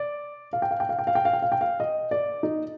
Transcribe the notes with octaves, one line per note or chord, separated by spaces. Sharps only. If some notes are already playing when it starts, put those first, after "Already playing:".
Already playing: D5
F5
G5
F5
G5
F5
G5
F5
G5
F5
G5
F5
G5
F5
D#5
D5
D#4